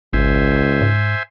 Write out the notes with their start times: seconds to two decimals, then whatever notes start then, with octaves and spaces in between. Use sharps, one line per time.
0.13 G#1 C#2 C5 E5 G#5
0.82 G#2